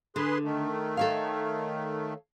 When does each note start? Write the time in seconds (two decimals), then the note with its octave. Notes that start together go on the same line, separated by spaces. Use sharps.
0.16 D3 G#4 B4 C6
0.44 D#3 A3
0.97 A4 C#5 F5